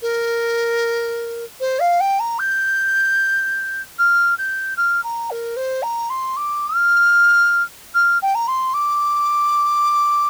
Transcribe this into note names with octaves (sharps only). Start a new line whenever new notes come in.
A#4
C5
F5
G5
A#5
G6
F6
G6
F6
A#5
A#4
C5
A#5
C6
D6
F6
F6
G5
A#5
C6
D6